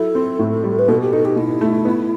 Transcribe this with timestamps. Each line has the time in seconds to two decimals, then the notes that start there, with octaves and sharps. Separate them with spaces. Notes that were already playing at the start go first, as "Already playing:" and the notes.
Already playing: F#3 E4 A4
0.15 C4
0.39 A2
0.64 G3
0.78 B4
0.88 B2 A4
1.00 G4
1.12 D#4 A4
1.25 G4
1.36 B2 E4
1.61 A3
1.85 B3